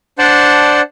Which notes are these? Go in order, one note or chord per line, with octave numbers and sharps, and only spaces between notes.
D4 C5 D5 F#5 A5